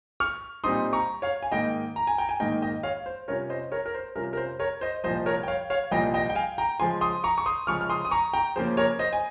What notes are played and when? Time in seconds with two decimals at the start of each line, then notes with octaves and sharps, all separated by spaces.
0.20 C#6 F6
0.64 A#2 G3 C4 D#4 C6 D#6
0.93 A#5 C#6
1.22 C#5 F5
1.43 G#5
1.52 G#2 D#3 A#3 D#5 G5
1.96 A#5
2.07 G#5
2.18 G5 A#5
2.29 G#5
2.40 G#2 D#3 A#3 D#5 G5
2.62 D#5 G5
2.83 C#5 F5
3.06 C5
3.28 C3 G3 C#4 F4 A#4 C#5
3.50 C5 D#5
3.72 A#4 C#5
3.86 A#4
3.95 C5
4.15 C3 G3 C#4 F4 A#4
4.33 A#4
4.37 C5
4.59 A#4 C#5
4.81 C5 D#5
5.04 C2 A#2 F3 C5 D#5
5.26 A#4 C#5
5.43 G5
5.48 C#5 F5
5.70 C#5 F5
5.91 C2 A#2 F3 D#5 G5
6.14 D#5 G5
6.30 G5
6.36 F5 G#5
6.58 G5 A#5
6.80 C#3 F3 G#3 G#5 C6
7.01 C6 D#6
7.24 A#5 C#6
7.38 C#6
7.46 C6 D#6
7.67 C#3 F3 G#3 C#6 F6
7.81 F6
7.90 C6 D#6
8.05 D#6
8.11 A#5 C#6
8.33 G5 A#5
8.56 C#3 F3 A#3 C#4 C5
8.77 A#4 C#5
8.99 C5 D#5
9.13 G#5